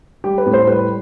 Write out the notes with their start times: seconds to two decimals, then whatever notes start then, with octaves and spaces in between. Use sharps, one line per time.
0.24 G3 G4
0.38 B4
0.46 A2
0.53 C5
0.68 G3 B4